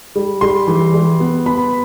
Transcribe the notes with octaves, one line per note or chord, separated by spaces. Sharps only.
G3
G3 C6
E3
G3
B3
B3 B5